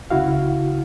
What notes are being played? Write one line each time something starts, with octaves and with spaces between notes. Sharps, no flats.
C#2 C#3 E4 F#4 F5